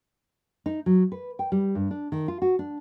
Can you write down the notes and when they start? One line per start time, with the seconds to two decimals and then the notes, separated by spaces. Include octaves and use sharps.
0.66 D#4
0.86 F#3
1.12 B4
1.39 G5
1.52 G3
1.75 G2
1.91 D4
2.12 D#3
2.28 F4
2.42 F#4
2.59 D4